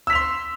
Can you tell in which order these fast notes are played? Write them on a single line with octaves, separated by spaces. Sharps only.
E6 B6 F7 C6